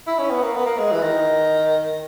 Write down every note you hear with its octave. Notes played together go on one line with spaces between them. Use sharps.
E4
C#4
B3
A#3
B3
A#3
G#3
E3
D#3